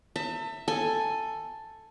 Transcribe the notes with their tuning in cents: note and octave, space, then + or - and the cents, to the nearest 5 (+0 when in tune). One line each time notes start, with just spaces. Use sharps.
E5 +0 A5 +40
A4 +5 G#5 +0